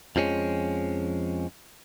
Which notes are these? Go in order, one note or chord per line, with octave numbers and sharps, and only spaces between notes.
F2 F3 G#3 C#4